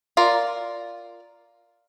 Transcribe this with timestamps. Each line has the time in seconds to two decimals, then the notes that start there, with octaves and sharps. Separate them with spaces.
0.17 F4 A#4 D5